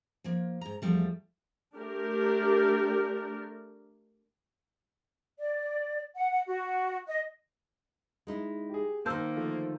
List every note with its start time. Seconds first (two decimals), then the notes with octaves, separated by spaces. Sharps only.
0.24 F3 A#3
0.61 G#2 A#5
0.82 E2 B2 F3 G3 A3
1.76 A3 D4 G4 A#4
5.39 D5
6.16 F#5
6.32 F#5
6.46 F#4
7.07 D#5
8.27 G#3 D#4 E4
8.70 G4 G#4
9.06 D#3 A#3 C5 A5 E6 G6
9.36 D3 F3 A3